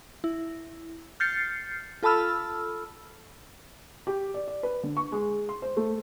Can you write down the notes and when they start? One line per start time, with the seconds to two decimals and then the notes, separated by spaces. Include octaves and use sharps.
0.24 E4
1.20 F6 G6 A6 C7 C#7
2.03 F4 A4 A5 B5 E6 F6
4.07 G4
4.34 D5
4.48 D5
4.63 B4
4.83 D3
4.97 C#6
5.12 G#3
5.49 C6
5.62 C5
5.77 A3